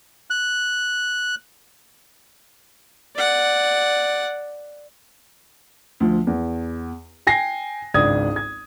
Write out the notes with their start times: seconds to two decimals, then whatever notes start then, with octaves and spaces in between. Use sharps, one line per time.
0.30 F#6
3.16 D5 F#5
6.00 D2 F3
6.27 E2
7.27 G5 G#5 A#6 C7
7.94 G#1 C#2 D4 D5 D#6 G#6
8.36 G#6